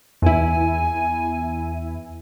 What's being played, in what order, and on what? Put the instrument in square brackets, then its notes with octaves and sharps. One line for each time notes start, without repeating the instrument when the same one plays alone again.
[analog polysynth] E2 E4 [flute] G#5